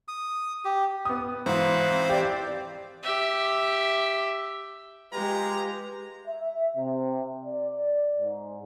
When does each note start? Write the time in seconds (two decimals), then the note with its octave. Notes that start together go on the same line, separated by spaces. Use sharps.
0.08 D#6
0.65 G4
1.05 B3 D#6
1.46 G#2 E3 F#4 C5 F5
1.91 E3 C4
2.10 G4 D5
3.03 G4 E5
5.13 G#3 F4 G4 B4 A#5
6.27 E5
6.77 C3
7.45 D5
8.19 G#2